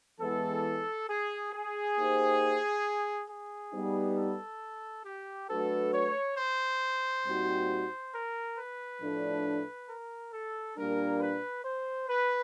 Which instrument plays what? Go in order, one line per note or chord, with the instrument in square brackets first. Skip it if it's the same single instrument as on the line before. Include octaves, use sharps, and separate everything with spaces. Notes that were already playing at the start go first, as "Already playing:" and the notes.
[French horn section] E3 G#3 B3 [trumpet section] A4
[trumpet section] G#4
G#4
[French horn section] A#3 D#4 G4 C5
[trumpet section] G#4
[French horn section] G3 B3 D#4
[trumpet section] A4
G4
[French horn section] F#3 A3 D4 F#4 B4 [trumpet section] A4
[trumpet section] C#5
C5
[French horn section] A#2 G3 C4 D#4 F#4
[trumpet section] A#4
B4
[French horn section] A2 F3 A3 D4
[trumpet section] A#4
A4
[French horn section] A#2 G3 A#3 D4 [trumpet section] A#4
[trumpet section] B4
C5
B4